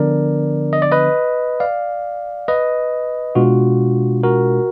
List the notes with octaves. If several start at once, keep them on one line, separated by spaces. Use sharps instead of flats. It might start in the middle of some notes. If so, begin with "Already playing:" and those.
Already playing: D3 F3 B3 D4 A#4 D5
D#5
D5
B4 D#5
D5 F5
B4 D#5
B2 G#3 D4 F4 F#4
F#4 A#4